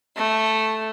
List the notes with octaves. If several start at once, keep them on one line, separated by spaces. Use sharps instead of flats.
A3